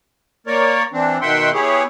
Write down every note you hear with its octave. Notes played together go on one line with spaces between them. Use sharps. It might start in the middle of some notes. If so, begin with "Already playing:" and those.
A#3 A#4 C#5 D5
E3 C4 D4
B2 D#3 E5 F#5 G5 C6
B3 E4 G4 G#4 C#5